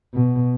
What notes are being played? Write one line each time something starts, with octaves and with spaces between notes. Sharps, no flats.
B2